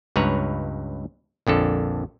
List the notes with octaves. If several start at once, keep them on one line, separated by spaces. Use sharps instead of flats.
C#2 G2 B4 C#5 A#5
A#1 F2 D3 A4